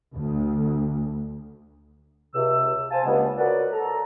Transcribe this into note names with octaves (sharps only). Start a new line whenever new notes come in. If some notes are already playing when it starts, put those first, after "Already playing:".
D2
C#2 C3 E6
C5 F5 G#5 A5
C#2 G2 C#3 G#3 A#3 B3
F#4 A#4 B4 C#5 D5
A4 A#5